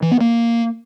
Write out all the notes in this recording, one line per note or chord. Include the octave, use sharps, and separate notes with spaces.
E3
B3
A#3